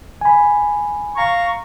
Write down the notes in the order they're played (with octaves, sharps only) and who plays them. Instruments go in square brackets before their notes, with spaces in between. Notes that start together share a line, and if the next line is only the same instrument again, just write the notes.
[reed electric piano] G#5 B5
[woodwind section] F5 A#5 C#6